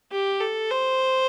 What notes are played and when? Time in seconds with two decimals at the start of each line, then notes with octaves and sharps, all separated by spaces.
0.12 G4
0.40 A4
0.70 C5